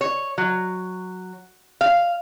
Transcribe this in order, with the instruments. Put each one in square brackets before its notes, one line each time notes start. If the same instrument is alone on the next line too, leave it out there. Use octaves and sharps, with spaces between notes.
[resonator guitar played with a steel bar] C#5
F#3
F5